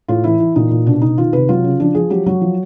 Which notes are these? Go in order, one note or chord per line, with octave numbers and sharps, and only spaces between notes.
A2 F4
E3 E4
E3
A#2 D#4
A#2
B2 D4
B2 D#4
D#3 F4
C3 B4
F#3 F4
C#3
F3 D4
F3 G#4
F#3 G4
F#3 F#4
F3